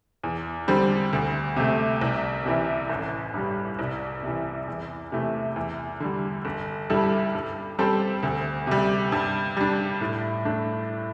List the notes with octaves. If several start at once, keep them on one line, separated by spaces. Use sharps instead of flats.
E2
D3 G3 C4
D2
C3 A3
C2
C3 E3
A1
G2 G3
C2
C3 E3
E2
C3 E3 A3
E2
D3 G3
G1
G2 G3 E4 A4
G2
G3 C4 A4 C5
D2
C3 G3
G2
G3 D4
A2
A3 D4